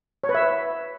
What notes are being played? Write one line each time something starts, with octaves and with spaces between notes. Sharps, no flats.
C#5
B4
E5